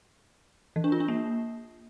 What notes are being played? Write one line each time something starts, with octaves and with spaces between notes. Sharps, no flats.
E3
D4
F4
D4
A#3